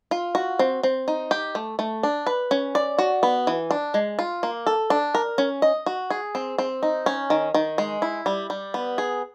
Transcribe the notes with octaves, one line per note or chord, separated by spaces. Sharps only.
F4
F#4
C4
C4
D#4
G4
A3
A3
D4
B4
C#4
D5
F#4
B3
E3
D4
G#3
F4
A#3
A4
D4
A#4
C#4
D#5
F#4
G#4
C4
C4
D#4
C#4
D#3
D#3
G#3
E4
G3
G3
B3
G#4